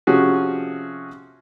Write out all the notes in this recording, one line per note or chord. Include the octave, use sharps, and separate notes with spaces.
C3 F3 C#4 F#4 G#4